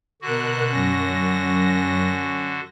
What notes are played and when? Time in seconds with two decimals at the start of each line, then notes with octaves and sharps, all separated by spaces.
0.22 B2 D3 F#4 A#4 F#6
0.70 F#2 C#4 A#6